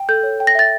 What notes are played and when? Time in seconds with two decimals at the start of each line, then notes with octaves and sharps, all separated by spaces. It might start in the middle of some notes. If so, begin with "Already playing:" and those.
Already playing: G5
0.09 A4 G6
0.23 C#5
0.40 G5
0.47 A#6
0.55 E5 A6